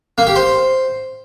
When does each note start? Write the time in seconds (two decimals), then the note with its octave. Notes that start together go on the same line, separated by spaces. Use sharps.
0.18 A#3
0.27 G4
0.36 C5